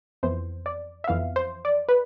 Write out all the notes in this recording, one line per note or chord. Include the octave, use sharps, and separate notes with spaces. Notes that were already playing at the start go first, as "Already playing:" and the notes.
F2 E3 B3 C5
D5
E5
F2 E3 B3 F5
C5
D5
B4